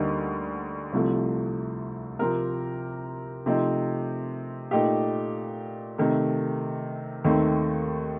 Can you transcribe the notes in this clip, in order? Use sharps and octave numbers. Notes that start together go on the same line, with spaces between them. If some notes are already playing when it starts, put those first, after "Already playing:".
Already playing: D2 D3 G3 A#3 D#4
C2 C3 F3 A3
C3 F3 C4 G4 A#4
C3 F3 A3 C4 D#4
A#2 A3 D#4 G4
C3 D#3 A3
D#2 D#3 A3 C4